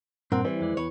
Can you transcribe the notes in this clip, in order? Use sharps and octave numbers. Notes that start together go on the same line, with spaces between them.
G2 A#2 C4 A#4 F#5
E3 G3 C5
F2 G#3 D5
E2 B4 C#5